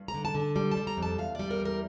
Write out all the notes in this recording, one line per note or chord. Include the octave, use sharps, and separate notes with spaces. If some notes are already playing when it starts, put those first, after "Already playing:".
Already playing: G2
A#5
D3
A5
D3
A5
G3
A5
G3
A#5
F2
A5
E2 F5
G3 D5
A#4
E2
A#4